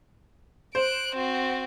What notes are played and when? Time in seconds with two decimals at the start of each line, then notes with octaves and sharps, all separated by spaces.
0.75 C5 F#6 D7
1.15 C4 F#4